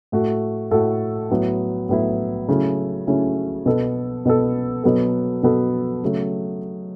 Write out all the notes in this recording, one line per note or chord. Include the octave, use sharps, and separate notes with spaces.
A2 A3 F#4 A4
A2 A3 F#4 A4
A2 F#3 B3 E4
A2 F#3 B3 E4
C#3 F#3 A3 C#4 E4
C#3 F#3 A3 C#4 E4
B2 B3 A4
B2 B3 A4
B2 F#3 B3 A4
B2 F#3 B3 A4
C#3 F#3 A3